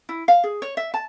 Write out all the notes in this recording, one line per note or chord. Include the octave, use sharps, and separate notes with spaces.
E4
F5
G#4
C#5
E5
A5